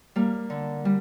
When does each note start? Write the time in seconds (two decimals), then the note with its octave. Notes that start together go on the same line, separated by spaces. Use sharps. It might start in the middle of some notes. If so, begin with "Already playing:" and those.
0.16 G3 A#3
0.50 D3
0.85 G3